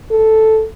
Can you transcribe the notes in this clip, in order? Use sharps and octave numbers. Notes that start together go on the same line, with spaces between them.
A4